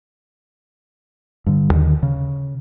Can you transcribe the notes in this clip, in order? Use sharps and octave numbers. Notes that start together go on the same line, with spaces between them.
G2 D3
D#2 D3 D#3
C#3